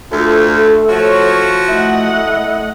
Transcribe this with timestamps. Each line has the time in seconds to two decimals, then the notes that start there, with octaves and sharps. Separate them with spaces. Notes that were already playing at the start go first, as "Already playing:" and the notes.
0.12 D2 A3 F4 A4
0.89 F3 F#4 C#5
1.69 A3 E4 D#5 F#5